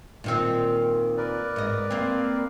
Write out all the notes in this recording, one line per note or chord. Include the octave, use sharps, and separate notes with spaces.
A#2 D#3 C4
A#4 B4 D5
G#2 D#5
A#3 C4